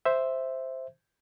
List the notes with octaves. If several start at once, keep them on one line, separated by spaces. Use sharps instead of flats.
C5 E5